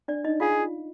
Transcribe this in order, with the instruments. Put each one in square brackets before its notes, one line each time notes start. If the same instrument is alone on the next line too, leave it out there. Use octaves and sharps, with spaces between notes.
[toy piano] D4 D5
D#4 D#5
[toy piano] F4 F5 [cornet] G#4